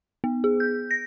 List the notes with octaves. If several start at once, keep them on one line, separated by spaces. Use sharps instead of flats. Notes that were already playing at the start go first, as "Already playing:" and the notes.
B3
G#4
G6
A#6